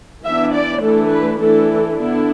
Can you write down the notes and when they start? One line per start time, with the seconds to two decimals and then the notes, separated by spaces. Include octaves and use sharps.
0.23 E3 B3 D4 E5
0.53 D5
0.81 E3 A3 D4 A4
1.10 B4
1.38 E3 A3 D4 A4
1.96 D3 B3 D4 E4